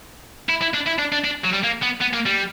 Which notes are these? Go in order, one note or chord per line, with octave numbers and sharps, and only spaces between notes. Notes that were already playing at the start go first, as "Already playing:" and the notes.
E4
E4
D4
E4
D4
D4
D4
F#3
G3
A#3
B3
B3
A#3
G3